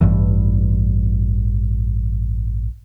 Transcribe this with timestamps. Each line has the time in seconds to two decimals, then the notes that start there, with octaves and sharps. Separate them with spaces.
0.01 A1 G2 E3